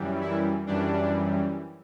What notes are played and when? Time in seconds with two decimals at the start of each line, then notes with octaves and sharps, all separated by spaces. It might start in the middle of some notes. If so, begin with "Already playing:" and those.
Already playing: F#2 E3 G3
0.21 E4
0.66 F#2 E3 G3 D4